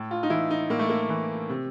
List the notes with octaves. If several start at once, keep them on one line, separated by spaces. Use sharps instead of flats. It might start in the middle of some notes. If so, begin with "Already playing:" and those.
Already playing: A2
F4
D#4
E3 E4
D#4
A2 A#3
A3
A#3
E3
C3